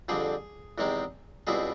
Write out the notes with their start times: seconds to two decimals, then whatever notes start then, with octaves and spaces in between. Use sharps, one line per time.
0.09 F2 D3 G3 C4 G#4
0.78 E2 C3 D#3 G#3 C4
1.47 C#2 B2 G3 C4 E4 G#4